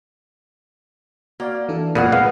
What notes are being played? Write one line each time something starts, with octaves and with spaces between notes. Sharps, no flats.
A#3 F#4 D5 F5
E3 D4 A4
F2 A#2 G#4 A#4 F#5 B5
A#2 G#3 B3 F5